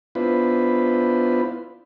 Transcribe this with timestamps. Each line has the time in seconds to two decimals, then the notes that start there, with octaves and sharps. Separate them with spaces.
0.15 B3 D4 E4 F4 B4 C5